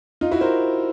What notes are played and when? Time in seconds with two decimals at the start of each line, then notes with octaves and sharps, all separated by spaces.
0.21 D#4 F4
0.31 E4 F#4
0.41 A#4 C5